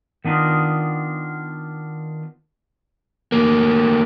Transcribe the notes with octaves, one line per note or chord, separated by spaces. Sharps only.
D#3 B3 D4 D#4 F4
D2 A#3